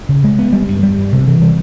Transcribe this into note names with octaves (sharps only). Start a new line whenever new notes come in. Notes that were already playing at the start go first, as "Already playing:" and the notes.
C#3
G#3
B3
G3
G2
G3
G2
C3
E3
G3